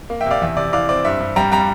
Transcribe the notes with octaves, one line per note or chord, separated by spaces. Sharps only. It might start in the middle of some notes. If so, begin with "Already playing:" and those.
A#3
E5 G5
C3 D5 F5
E2 E5
C3 D5
E3 D5 F5
C4 D5
G2 E5
G2
G3 G5 A#5
G3 G5 A#5